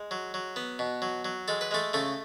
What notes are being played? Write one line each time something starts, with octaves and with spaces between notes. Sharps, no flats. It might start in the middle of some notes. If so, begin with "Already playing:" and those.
Already playing: G#3
F#3
F#3
B3
B2
F#3
F#3
G#3 A4
B4
G#3 A3 A4
C#3 A3 A4